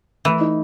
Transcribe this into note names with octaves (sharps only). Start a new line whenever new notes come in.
E3 A3
D#4